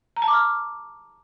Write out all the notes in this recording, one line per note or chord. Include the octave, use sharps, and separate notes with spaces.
A#5
A5
D6
F6